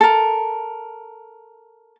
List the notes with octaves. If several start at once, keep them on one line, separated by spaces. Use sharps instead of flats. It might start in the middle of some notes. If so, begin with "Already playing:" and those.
A4 A#4